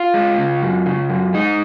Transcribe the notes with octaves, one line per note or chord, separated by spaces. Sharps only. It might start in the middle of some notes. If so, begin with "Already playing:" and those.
Already playing: F4
G#3
C#3
F#2
C#3
F#2
G#3 D#4